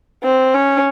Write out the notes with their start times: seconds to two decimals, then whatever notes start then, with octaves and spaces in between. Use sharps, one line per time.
0.23 C4
0.54 C#4